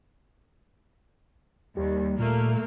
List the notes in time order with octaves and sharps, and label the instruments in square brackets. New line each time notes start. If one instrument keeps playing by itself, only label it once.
[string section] D#2 [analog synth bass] G3
[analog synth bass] A#2 [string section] A3 A#3